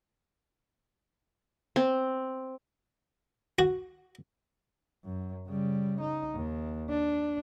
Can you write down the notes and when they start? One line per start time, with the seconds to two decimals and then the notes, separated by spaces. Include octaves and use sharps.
1.76 C4
3.59 F#4
5.05 F#2
5.48 C#3 G3
6.00 D#4
6.35 D#2
6.89 D4